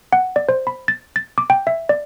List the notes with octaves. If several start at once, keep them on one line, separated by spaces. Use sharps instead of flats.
F#5
D5
C5
B5
A6
A6
D6
G5
E5
D5